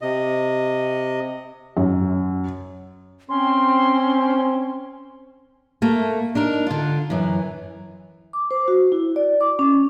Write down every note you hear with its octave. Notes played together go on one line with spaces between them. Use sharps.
C3 D#5
F#2
C4 C#4 C6
A3 A#3
D4 D#4 A#4
D3 F4
F#2 E3
D6
C5
F#4
E4
D5
D6
C#4